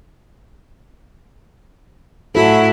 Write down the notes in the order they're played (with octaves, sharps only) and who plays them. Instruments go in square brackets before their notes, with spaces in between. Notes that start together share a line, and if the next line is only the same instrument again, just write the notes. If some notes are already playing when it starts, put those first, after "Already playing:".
[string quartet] A2 F#3 E4 [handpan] F#4 A4